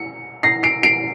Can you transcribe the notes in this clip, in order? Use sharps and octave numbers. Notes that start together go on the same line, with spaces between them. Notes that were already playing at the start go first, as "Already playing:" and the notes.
Already playing: C#7
A#6 C7
C7 D7
C7 D7